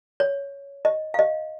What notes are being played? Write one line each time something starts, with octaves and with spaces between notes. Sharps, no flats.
C#5
D#5
F5
D#5